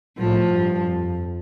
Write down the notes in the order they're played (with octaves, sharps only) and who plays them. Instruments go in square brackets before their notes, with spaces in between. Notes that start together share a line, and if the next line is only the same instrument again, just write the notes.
[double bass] A2 [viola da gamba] F3
[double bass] G2
F2